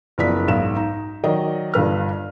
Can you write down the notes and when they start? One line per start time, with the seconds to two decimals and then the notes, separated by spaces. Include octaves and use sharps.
0.18 F#1 F3 B3 D5 B6
0.48 B1 G#2 E7
0.76 D#4
1.24 D#3 F#3 D5 D#5
1.74 G1 G2 B4 F6